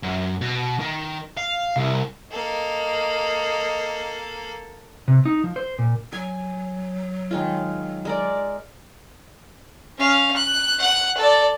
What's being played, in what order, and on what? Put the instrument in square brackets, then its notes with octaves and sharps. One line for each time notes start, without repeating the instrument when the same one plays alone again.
[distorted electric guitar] F#2
B2
D#3
F5
C2
[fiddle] A#3 A4 [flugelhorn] D#5
[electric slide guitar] C3
D#4
F3
C5
A#2
[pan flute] F#3 [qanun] G#5
[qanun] D#3 G#3 F4
G#3 A#4 D5
[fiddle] C#4 F5
F#6
F#5 F#6
A4 D5